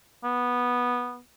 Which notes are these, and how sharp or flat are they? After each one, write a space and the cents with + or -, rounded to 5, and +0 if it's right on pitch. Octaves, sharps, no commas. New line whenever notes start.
B3 -10